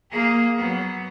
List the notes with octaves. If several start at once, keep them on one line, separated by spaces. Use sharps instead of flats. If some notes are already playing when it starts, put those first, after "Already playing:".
A#3 G#4
F#3 B3